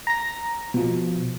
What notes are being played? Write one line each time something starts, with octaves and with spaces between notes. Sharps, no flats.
A#5 A#6
B2 F3